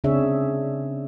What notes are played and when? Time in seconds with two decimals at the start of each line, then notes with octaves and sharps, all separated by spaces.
0.04 C#3 C4 D4 G#4 C#5 E5